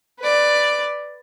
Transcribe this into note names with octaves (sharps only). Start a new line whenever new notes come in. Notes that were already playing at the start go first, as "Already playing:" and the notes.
B4 D5